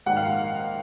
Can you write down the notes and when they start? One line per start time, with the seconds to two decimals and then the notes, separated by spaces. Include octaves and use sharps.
0.06 A#1 G#2 D#3 A#3 F#5
0.17 F5
0.26 F#5